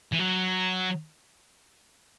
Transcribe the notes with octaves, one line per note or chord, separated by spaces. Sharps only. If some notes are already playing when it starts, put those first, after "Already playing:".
E3
F#3